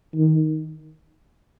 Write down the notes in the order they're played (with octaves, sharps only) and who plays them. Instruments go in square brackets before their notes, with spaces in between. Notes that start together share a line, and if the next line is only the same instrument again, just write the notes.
[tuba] D#3